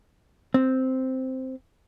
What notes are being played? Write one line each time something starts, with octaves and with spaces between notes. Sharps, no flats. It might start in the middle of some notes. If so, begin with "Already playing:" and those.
C4